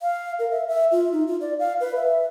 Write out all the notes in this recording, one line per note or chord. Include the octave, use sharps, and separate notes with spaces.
F5
A#4
E5
E5
F4
D#4
F4
D5
F5
B4
E5